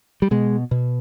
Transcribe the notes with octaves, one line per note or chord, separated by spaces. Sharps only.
G3
B2 G#3
B2